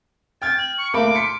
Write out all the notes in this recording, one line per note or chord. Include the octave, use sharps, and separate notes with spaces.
G5 F6 G#6 A6
F#7
C#6
D2 A#3 B5 D6
C6 B6 C#7